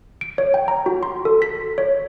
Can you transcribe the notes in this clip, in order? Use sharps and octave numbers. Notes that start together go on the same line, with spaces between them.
D7
C#5
G5
A#5
F#4
C6
A4
B6
C#5